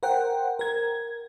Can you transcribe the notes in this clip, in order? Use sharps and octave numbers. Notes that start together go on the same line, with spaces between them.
A#4 C5 F#5 G5
A#4 G#6